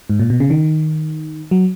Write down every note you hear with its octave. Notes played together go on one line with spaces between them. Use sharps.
G#2
A#2
B2
C#3
D#3
F#3